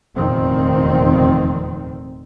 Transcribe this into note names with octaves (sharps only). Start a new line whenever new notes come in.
F1 E2 A#2 D#3 C4